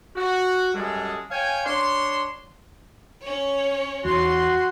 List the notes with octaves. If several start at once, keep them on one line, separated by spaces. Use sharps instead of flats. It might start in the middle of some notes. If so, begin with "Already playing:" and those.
F#4
F#2 G3 G#3 G#4 A4
C#5 F5 G5 G#5
D4 C#5 C6
C#4 C#5
E2 F#4 C6